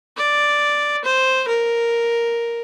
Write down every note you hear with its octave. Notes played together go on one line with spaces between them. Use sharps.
D5
C5
A#4